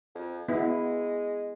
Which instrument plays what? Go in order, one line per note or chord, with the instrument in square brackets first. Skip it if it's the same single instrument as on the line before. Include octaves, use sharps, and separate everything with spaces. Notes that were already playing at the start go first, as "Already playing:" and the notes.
[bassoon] F2
[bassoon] G#3 [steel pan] B3 E4